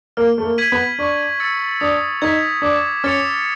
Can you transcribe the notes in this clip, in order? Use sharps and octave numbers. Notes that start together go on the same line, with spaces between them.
A#3 F6
A3
A#3
G#6 B6 D#7 F#7
B3
D4 C#6
E6 A6 C#7
D4 D#6
D#4 G#6 B6
D4 D6
C#4 F6 A6 C#7 F7